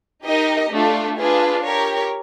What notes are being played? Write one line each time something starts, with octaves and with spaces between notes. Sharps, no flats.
D#4 G4 A#4 D#5
A3 D4 F4
D4 F4 G#4 B4
G4 A#4 C#5